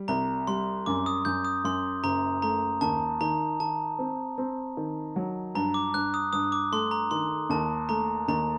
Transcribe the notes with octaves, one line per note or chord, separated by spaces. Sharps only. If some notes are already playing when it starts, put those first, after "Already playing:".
Already playing: G3
C2 A#5
G3 C6
F#2 D6
D#6
F#2 G6
D#6
F#2 C6
F#1 A#5
A3 A#5
D#2 A5
D#3 A#5
D#3 A5
C4
C4
D#3
F#3
G2 A#5
D6
G2 F#6
D#6
G2 D#6
D6
A3 C6
A#5
D#3 C6
D#2 A5
A3 A#5
D#2 A#5